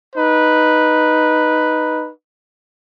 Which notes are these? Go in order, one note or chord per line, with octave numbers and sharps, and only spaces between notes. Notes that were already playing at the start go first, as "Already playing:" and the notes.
D#4 B4